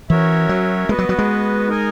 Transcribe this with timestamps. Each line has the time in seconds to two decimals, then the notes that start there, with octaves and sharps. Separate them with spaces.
0.09 E3 C#4 F#4 A#4 C#5 E5
0.49 F#3
0.89 G#3 B3 F#4 B4 D#5
0.98 F#3
1.09 F#3
1.19 G#3
1.68 D#4 A#4 D#5 G#5